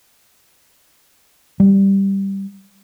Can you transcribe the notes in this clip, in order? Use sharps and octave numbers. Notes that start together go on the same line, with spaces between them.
G3